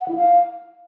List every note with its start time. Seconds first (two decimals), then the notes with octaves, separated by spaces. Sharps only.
0.01 F#5
0.08 E4
0.16 F5